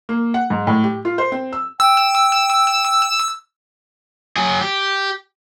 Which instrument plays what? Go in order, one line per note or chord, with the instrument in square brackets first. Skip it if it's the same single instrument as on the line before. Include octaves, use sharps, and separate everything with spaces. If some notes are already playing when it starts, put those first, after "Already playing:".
[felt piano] A#3
F#5
G#2
A2
G4
F4
C5
C4
E6
[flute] G5 [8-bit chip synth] E6
[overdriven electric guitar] F#3 G#4
G4